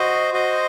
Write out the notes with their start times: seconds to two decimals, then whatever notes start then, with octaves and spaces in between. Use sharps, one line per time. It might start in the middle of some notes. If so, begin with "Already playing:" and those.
Already playing: F#4 C5 D#5
0.33 F#4 C5 D#5